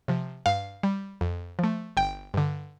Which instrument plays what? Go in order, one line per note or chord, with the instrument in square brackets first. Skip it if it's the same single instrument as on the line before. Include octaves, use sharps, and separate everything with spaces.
[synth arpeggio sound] C3 F3
G2 F5
G3
F2
F3 A3
G1 G5
G2 D3